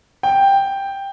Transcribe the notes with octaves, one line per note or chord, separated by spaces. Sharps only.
G5